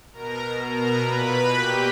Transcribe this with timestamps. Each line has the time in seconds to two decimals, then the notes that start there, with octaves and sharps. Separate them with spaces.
0.13 B2 A#4 A#5
0.41 B2
0.69 B2 A#4 A#5
0.98 A#2 B4 B5
1.27 B2
1.55 A#2 G4 G5